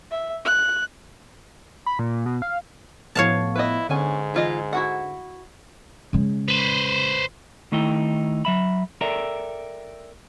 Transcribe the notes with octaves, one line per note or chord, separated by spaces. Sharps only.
E5
F#6
B5
A#2
B2
F5
A2 F3 B3 C#5 F5 A5
E4 B4 D#5
G#2 D3 B3 C#4 G#5
E3 F4 D#5
E4 F#4 F#5
C#3 G#3
B4 C5
D#3 A3 D#4 E4 G5
F#3 E5 B5
A4 A#4 D5 E5 G5 A#5